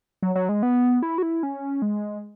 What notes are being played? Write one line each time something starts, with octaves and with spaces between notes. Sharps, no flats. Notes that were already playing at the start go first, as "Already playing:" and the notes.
F#3
F#3
G#3
B3
E4
F#4
E4
C#4
G#3